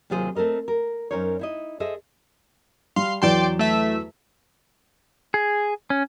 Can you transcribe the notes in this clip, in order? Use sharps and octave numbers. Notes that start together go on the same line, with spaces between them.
D#2 C3 F#3 F4 G#4 C5
A3 C4 A4 A#4 D#5
A#4
F#2 C#4 D#4 A#4 C5 C#5
D#4 E4 D#5
G#4 A4 C5 D#5 E5
G3 F5 C6
E2 F#3 D5 G5 C6 E7
A3 E5
G#4
C#4